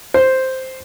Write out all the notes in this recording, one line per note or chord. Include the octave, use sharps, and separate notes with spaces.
C5